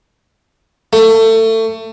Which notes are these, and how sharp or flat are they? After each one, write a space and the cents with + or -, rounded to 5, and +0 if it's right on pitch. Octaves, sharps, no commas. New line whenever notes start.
A3 +25